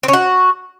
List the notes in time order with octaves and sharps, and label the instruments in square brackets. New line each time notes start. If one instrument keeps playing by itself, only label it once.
[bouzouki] C4
C#4
F#4